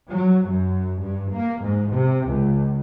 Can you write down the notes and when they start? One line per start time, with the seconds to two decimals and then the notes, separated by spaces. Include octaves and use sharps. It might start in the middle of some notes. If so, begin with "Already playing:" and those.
0.11 F#3
0.49 F#2
1.02 G2
1.34 A#3
1.63 G#2
1.94 C3
2.31 C#2